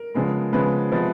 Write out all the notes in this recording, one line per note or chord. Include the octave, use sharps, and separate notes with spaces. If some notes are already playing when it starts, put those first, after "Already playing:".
Already playing: A#4
C#3 F3 G#3 B3
C#3 F3 G#3 B3 B4
C3 F3 G#3 B3